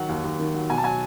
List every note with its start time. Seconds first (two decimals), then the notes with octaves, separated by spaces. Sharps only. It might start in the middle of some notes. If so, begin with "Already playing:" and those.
Already playing: D#3 F#3 F#5
0.09 D#2
0.24 D#2
0.40 D#3
0.54 F#3
0.70 B2 G#5
0.78 A5
0.84 F#3 G#5